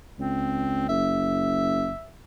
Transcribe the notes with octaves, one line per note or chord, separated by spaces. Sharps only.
C#2 C4
F#1 E5